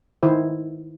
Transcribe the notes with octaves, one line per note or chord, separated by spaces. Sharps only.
D#3 E4 C5